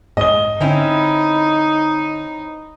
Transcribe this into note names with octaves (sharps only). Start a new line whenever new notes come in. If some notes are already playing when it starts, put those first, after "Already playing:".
G#2 D#5 G7
D3 C4 C#4 D#4 E4